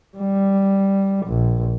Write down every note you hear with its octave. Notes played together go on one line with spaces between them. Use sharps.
G3
A#1